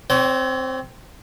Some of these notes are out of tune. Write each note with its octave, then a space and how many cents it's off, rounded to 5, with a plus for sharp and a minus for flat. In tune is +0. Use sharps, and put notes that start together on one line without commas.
C4 +0 C#5 +35 G5 -40